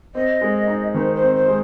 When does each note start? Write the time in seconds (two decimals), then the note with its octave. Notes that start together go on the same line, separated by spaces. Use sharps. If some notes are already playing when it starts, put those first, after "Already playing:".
0.15 C4 D#5
0.41 G#3
0.68 D#4
0.94 D#3 C5
1.15 C5
1.22 C4
1.35 C5
1.48 G#3